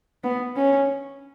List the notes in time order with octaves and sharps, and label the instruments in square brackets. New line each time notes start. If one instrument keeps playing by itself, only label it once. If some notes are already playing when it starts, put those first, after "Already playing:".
[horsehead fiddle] B3
C#4